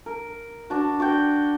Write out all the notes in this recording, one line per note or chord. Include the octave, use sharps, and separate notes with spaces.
A#4
D4 F#4
F#4 D5 G5